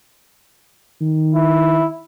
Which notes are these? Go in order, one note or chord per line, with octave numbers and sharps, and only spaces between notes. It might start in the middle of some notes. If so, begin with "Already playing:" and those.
D#3
E4